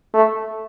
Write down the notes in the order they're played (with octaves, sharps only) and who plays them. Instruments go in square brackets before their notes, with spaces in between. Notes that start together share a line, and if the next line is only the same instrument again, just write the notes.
[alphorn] A3